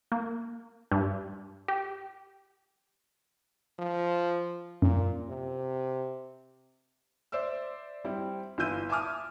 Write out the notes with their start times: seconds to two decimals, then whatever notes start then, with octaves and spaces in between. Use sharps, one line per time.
0.12 A#3
0.92 G2
1.68 G4
3.79 F3
4.82 F#2 A#2
5.29 C3
7.32 C5 D5 E5 E6
8.05 G3 C4 E4
8.58 G1 E3 F4 E6 G6 D#7
8.89 E5 G#5 A5 D6 D#6 F6